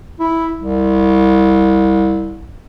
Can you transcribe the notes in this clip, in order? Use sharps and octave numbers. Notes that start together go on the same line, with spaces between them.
E4
C2